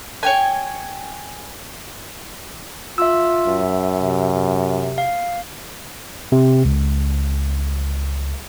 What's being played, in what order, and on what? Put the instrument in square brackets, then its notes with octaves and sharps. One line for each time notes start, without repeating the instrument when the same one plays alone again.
[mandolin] C#5 G5 G#5
[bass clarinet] F4 [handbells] E5 E6
[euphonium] F#2
[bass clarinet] C3
C3
[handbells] F5
[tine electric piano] C3
C#2